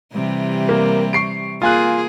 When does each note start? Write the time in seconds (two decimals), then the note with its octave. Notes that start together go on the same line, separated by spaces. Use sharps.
0.13 C3 E3 G3
0.69 A#3
1.13 C#6 C7 D7
1.62 A#3 F4 G#4 G#5 F#6